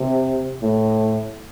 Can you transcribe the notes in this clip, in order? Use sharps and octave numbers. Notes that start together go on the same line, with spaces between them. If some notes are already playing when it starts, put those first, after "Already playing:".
Already playing: C3
A2